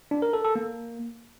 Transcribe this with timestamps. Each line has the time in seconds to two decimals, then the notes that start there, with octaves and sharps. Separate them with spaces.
0.11 D4
0.22 A#4
0.33 A4
0.44 A4
0.55 A#3